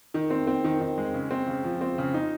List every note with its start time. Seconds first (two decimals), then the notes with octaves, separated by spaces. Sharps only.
0.14 D#3
0.30 C4
0.47 C4
0.64 D#3
0.80 D#3
0.98 G#3
1.14 C#3
1.31 C4
1.48 C#3
1.64 F3
1.81 C4
1.98 C#3
2.14 D#4